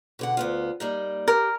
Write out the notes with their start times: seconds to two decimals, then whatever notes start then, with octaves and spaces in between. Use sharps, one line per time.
0.19 B2 D3 F#5
0.37 D2 B3 F4
0.80 G3 A#3 D#4
1.28 G4 A#4